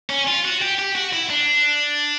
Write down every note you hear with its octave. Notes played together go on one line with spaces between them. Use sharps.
C#4
F4
F#4
G4
G4
F#4
E4
D4